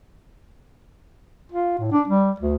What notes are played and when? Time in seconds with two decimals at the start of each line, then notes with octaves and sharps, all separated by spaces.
1.52 F4
1.78 A2
1.92 D4
2.07 G3
2.40 D2